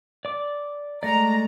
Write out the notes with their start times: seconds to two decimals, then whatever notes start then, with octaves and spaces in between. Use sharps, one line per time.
0.25 D5 D6
1.03 G#3 A3 D5 A#5